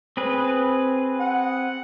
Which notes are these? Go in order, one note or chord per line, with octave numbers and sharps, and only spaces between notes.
C4 G#4 B4
F#5